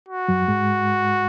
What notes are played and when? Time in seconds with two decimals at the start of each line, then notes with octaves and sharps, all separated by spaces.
0.08 F#4
0.28 F#2 F#3
0.48 G#2 G#3